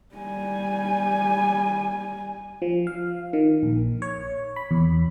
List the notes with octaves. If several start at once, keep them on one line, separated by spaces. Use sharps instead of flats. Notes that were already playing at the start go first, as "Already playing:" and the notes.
G3 G#5
F3
F5
D#3
A#1
C#5
B5
E2